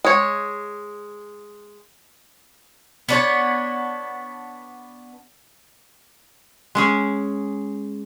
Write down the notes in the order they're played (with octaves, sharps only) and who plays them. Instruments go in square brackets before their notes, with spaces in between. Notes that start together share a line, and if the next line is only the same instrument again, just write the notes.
[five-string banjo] G#3 C#5
[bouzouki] B3 D4 C#5
[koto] G#3 C#4 G#4